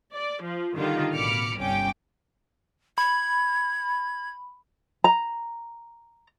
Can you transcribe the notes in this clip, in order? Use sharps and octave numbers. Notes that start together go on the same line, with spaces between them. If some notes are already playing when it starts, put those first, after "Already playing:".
D5
F3
D3 D#3 G3 F4
A1 B2 B5 D6 F6 C#7
G1 C2 G2 C#4 G5 D6
B5 G#6
A#5